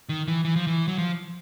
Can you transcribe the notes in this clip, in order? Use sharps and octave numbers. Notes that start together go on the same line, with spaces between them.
D#3
E3
E3
F3
E3
F#3
F3